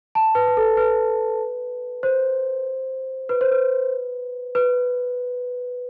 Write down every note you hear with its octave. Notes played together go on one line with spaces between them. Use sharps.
A5
B4
B4
A4
B4
C5
B4
C5
B4
B4